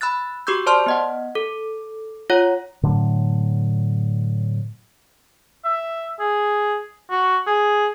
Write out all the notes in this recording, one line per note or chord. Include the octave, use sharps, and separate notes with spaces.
B5 E6 F#6 A6
F#4 G4 C#6 D6 E6 G6
C5 D5 A5 C6 F6
B3 D#5 F#5
A4
F4 C#5 F#5
A2 D3 F#3
E5
G#4
F#4
G#4